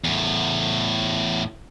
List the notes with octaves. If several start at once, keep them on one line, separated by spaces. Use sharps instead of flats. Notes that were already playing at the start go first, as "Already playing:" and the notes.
E2 A2